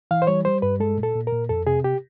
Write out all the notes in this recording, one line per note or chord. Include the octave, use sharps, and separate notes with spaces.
E3 F5
C5
G3 C#5
G3 C5
G2 B4
G#3 A4
A#2
A4
A#2
A#4
A#2
F2 A4
C3 G#4
G4